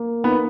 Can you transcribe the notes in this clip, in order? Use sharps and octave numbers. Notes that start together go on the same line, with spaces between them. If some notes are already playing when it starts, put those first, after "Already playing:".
Already playing: A#3
B3 D#4